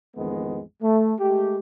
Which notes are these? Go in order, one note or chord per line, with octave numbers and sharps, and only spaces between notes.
A1 F2 D#3 G#3 B3
A3
G#3 A3 G4